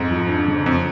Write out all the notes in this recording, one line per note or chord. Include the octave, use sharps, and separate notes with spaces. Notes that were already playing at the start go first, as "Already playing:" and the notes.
Already playing: F2 G#2
F3
D4
C#3
F2 F3